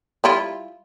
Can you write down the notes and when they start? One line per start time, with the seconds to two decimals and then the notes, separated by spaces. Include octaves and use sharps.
0.24 G3 E4 F4